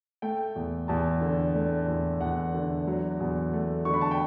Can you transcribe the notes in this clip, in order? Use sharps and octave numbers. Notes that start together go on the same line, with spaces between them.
A3 G5
E2
E2 A5
D3
A3
E2
E2 F#5
D3
F#3
E2
A3
D3 C#6
B5
A5
G5